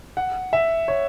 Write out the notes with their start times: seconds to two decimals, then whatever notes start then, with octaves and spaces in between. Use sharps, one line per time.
0.17 F#5
0.53 E5
0.88 C#5